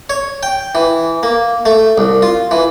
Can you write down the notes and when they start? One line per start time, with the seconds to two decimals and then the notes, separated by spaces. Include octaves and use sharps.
0.10 C#5
0.43 G5
0.75 E3
1.23 A#3
1.66 A3
1.98 C2
2.22 F4
2.51 E3